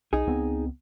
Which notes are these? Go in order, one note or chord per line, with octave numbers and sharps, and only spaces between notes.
B1 D#4 G#4
C#2 B3 C4